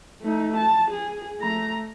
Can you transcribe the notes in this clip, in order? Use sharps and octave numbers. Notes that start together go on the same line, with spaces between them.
A3 D#4
A5
G#4
A3 A#5